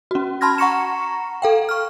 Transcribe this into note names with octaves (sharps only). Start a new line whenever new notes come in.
C#4 F#4
A5 B5 C6 F6 G#6 A#6
F#5 A#5 C#6 A#6 C#7 E7
A4 F5 G5
C#6 F6